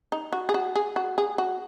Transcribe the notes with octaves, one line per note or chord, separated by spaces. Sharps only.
D#4
F#4
G#4
F#4
G#4
F#4
G#4
F#4